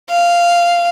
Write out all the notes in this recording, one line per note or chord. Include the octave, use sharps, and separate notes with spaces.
F5